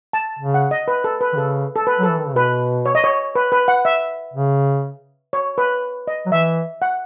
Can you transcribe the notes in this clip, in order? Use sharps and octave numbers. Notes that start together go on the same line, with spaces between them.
A5
C#3
F#5
D#5
B4
A4
B4
D#3
C#3 A4
A4
B4
F#3 A4
E3
D#3
C#3
B2 B4
C#5
D#5
C#5
B4
B4
F#5
E5
C#3
C#5
B4
D#5
F#3
E3 E5
F#5